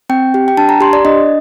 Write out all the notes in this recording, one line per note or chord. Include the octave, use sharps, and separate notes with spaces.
C4 G5
G4
G5
D4 A5
A#5
G4 C6
D5
D4 D#5